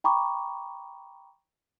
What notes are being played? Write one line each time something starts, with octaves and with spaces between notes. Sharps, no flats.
G5 A#5 B5 C#6 D6